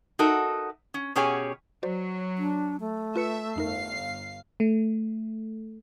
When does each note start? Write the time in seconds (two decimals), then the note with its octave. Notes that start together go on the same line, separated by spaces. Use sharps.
0.19 D#4 F#4 A4 A#4 E5
0.94 C#4
1.15 B2 C#4 G4 G#4 C#5 G#5
1.83 F#3 F#4 C5 D5
2.38 D4
2.81 A3
3.16 F4 B4 E5 C#7
3.56 G1 F2 D#4 A#4 F5 C7
4.60 A3